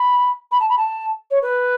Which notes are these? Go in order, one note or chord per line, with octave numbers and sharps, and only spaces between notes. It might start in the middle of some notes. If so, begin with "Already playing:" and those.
Already playing: B5
B5
A5
B5
A5
C#5
B4